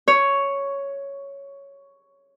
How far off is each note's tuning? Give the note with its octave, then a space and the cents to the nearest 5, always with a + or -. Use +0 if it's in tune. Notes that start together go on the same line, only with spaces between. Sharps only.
C#5 +5